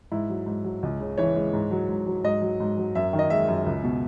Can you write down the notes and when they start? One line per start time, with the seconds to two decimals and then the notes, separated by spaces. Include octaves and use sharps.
0.12 G#2 E4
0.29 F#3
0.46 G#2
0.64 F#3
0.83 C#2
1.00 C#3
1.18 E3 C#5
1.36 G#3
1.53 G#2
1.71 F#3
1.89 G#2
2.07 F#3
2.24 G#2 D#5
2.42 F#3
2.60 G#2
2.78 F#3
2.95 F#2 E5
3.13 D#3
3.19 D#5
3.30 G#3 E5
3.48 F#2
3.66 C#2
3.84 B2